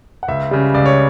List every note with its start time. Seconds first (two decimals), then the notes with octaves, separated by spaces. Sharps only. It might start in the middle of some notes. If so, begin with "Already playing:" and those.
0.23 F#5
0.28 C#2 E5
0.51 C#3 G3
0.74 C#2 D5
0.86 C#5